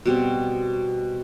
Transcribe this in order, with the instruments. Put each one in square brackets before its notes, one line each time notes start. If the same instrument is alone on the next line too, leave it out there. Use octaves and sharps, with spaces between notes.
[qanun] B2 G3 C4